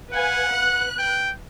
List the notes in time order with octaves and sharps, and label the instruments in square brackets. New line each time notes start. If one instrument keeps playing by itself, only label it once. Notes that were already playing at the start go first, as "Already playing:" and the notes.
[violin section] B4 F5 G#5 [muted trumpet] F#5
[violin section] B4 F#6
[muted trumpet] G5